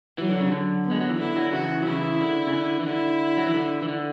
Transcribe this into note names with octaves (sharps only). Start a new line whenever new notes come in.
E3 F#3
D3
C#3
D3
B3
G#3
F#3
E3
D3 E4
D3 F#3
C#3 E3 F#4
F#3
C#3 E3 E4
D3
C#3
D3
E3
D3 E4
F#3
E3
D3
E3
D3